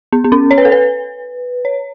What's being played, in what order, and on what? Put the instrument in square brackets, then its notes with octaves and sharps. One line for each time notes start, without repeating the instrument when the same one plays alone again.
[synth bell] B3
B3
C#4
C#5
B4
A4
B4
C#5